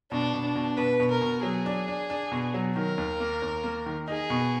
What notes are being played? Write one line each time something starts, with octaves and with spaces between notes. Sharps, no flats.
B2 D4
B2
D4
B2
B2 B4
B2
A#4
B2
F#3 G#4
D4
D4
D4
B2
F#3
D#3 A#4
D#2
A#3
D#2
A#3
D#3
D#4 G#4
B2